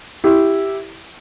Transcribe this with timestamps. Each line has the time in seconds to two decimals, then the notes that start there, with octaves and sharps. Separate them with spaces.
0.24 E4 G4